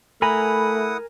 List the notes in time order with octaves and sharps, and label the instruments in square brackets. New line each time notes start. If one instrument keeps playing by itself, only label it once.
[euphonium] A3 [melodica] E4 F#5 D#6 [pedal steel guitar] A#4 G#5 A#5 [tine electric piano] B5